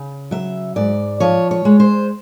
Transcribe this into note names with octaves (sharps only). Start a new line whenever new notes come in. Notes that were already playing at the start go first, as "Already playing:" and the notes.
Already playing: C#3
F#3 E5
G#2 D5
F3 C#5
C#5
G#3
C5